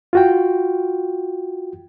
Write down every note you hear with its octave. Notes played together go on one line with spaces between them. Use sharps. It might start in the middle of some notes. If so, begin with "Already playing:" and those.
F4 F#4 G5